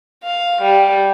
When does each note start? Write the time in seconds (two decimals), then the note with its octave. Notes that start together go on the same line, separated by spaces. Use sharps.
0.23 F5
0.60 G3